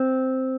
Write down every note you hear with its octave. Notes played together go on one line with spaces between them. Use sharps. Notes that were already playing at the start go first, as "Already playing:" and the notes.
Already playing: C4